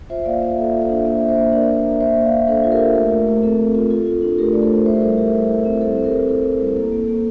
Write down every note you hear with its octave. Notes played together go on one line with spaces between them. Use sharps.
F4 C5 E5
A#3 D5 F5
A#3 C5 E5
A#3 A4 C5
F4
C5 E5
D4
A#3 C5 E5
A#3
C5 E5
A#3
D4 A#4 D5
D5
A#3 C5 E5
A#3
A#3 C5 E5
A#3
D5 F5
A#3
D4 A4 C5
F4
G4 A#4
F4
A3 G4 A#4
A3
A3
C4 A4
C4
F4
F4 A4
F4
D4
A3 G4 A#4
A3 D5
A4 C5
A3
E4 C5 E5
A#4
G3 A4 C5
G3 G4 A#4
G3
E4
C4
C4 A4 C5
C4
G4 A#4
G3
E4 A4
E4
G3
A#3 A4
A#3
A#3